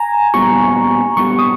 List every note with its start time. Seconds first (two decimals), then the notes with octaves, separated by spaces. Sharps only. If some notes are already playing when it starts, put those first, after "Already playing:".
Already playing: G#5 A#5
0.34 A#2 G3 B3 G4 C#6
1.16 A#2 G3 B3 G4 C#6
1.39 D#6